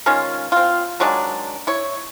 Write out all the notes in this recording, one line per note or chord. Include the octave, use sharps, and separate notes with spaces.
D#3 G#3 C#4 F4
C4 F4
D#3 F#3 G#3 D4
E4 C#5